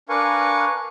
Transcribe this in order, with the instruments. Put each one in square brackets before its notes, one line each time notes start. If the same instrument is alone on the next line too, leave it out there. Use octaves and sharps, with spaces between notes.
[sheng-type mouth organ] D4 A#4 B4 F5 G#5 C#6